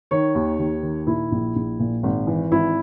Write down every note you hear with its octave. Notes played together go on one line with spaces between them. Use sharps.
D#3 C#5
D#2
D#2
D#3
A#2 E4
A#1
A#1
A#2
G#1
E3
G#1 E4